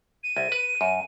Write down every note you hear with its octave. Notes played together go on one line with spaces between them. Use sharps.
D#7
C2
B4
F#2